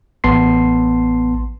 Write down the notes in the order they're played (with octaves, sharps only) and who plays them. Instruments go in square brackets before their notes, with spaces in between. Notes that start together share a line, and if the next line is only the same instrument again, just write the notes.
[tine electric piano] A1 B3 A5 C6 C7